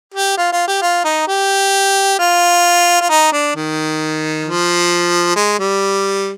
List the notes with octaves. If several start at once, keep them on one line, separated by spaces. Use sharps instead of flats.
G4
F4
F4
G4
F4
D#4
G4
F4
F4
D#4
D4
D#3
F3
G#3
G3